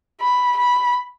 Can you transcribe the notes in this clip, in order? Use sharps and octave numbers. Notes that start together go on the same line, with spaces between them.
B5
B5